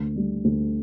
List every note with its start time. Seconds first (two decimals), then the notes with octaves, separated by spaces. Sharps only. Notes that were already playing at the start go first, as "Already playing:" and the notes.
Already playing: D2
0.16 G3
0.45 D2